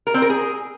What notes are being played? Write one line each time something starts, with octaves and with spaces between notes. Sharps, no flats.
A#4
C4
A#4
G#4